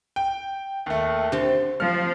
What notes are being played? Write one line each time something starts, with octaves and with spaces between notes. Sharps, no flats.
G5
D#2 A3
D3 C4 G4
F3 F6